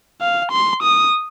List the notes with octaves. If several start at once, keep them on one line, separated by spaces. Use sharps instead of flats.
F5
C6
D#6